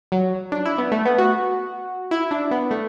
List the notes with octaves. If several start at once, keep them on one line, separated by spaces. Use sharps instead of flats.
F#3
D4
E4
B3
A3
B3
F#4
E4
D4
B3
A3